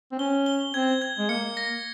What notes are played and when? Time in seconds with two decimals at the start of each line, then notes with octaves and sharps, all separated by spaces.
0.12 C4
0.19 C#4 G7
0.46 G7
0.74 C4 G#6
1.02 G#6
1.18 G#3
1.29 A#3 C#7
1.57 A#6